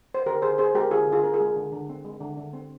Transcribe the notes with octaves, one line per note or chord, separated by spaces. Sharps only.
C5
D3 G4 A#4
D3 G#4 C5
C4 G#4 C5
G#3 G4 A#4
D3 F4 G#4
D3
F4 G#4
C4 A#4
F4 G#4
G#3
D3
D3
C4
G#3
D3
D3
C4